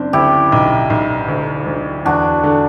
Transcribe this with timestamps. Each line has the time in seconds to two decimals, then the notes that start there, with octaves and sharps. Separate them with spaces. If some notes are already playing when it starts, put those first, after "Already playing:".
Already playing: F#1 C4 D4
0.13 D2 E4 G4
0.52 B1
0.90 B1
1.28 D2
1.67 D2
2.05 E2 D4 F#4
2.44 D3